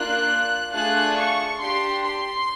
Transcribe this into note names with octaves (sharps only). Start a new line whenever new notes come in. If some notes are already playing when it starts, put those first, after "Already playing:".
Already playing: A#3 D4 F4 F#6
A3 D4 F4 G#4 F#6
C#6
D4 G4 C6
C6